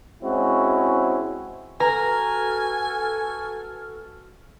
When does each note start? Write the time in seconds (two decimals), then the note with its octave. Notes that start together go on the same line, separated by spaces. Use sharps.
0.23 G#3 C4 C#4 E4 F#4
1.80 F#4 A4 B4 G#5 A#5 F6